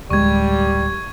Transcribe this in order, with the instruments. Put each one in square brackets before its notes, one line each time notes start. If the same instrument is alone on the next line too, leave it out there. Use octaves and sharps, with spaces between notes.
[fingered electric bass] D1 G#3 [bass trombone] G3 [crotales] C#6 G#6